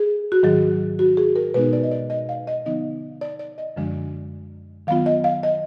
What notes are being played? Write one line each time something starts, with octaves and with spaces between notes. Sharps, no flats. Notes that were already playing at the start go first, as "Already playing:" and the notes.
Already playing: G#4
F#4
G#2 D#3 F#3 G#4
F#4
G#4
A#4
B2 G#3 B3 D#4 B4
D5
D#5
D5
D#5
F5
D#5
D3 F3 B3 D#4 D#5
D5
D5
D#5
F#2 D3 F3 G#3 D4
D#3 F#3 B3 F4 F5
D#5
F5
D#5